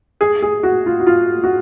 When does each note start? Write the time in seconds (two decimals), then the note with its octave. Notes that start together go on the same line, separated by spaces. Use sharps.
0.21 G#4
0.42 G#4
0.63 F#4
0.86 F4
1.00 F#4
1.07 F4
1.44 F#4